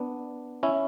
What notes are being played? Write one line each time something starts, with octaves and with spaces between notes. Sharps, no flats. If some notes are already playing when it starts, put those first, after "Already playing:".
Already playing: B3 D4
C#4 E4